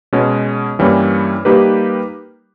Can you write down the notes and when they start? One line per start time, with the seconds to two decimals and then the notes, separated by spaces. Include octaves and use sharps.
0.13 B2 G#3 C#4
0.79 G2 E3 G3 A#3 C#4
1.45 G3 A#3 D#4 G4 B4